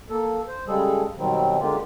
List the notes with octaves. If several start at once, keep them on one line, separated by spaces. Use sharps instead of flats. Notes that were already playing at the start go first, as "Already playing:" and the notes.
A#3 A4
C5
C#3 G3 G#3 G#4 A4
B2 D#3 F#3 G3 C4
D3 G#3 A#3 F4 G4